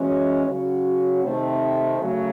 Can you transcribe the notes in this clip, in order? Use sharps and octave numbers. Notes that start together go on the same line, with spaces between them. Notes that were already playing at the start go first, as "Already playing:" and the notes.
Already playing: E3 G#3 C#4 F#4
C#3 F#3 C#4 F#4
C3 D#3 A3 C4
C#3 F#3 A3 C#4